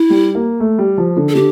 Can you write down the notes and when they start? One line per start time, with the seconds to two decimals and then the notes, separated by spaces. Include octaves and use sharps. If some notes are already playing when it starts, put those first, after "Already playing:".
Already playing: E4
0.10 G3
0.35 A#3
0.60 A3
0.78 G3
0.98 F3
1.17 D3
1.29 A4
1.35 D3 G4